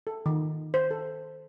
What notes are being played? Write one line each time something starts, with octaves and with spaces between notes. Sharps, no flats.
A4
D#3
C5
A4